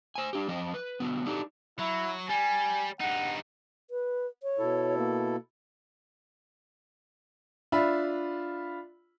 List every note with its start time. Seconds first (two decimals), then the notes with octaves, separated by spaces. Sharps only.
0.16 C5 G#5
0.33 D4 G4
0.48 F2 F3 C4 D#5
0.74 B4
1.00 D3 F#3 B3
1.26 D4 D#4 G4 A4
1.79 F#3 E4
2.29 G3 G#5
3.00 G2 D#4 F#5
3.90 B4
4.43 C#5
4.59 B2 E4 A4
4.98 A#3
7.72 D4 F4 E5 B5